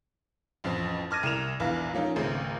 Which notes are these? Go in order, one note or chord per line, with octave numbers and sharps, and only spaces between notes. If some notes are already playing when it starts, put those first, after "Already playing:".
A1 F2 C4
A5 D6 F6 G#6 A#6 D#7
C2 A#4 E7 F7
A#1 E2 B4 F5
F3 A#3 C#4 D#4
G#1 C#2 A3 C4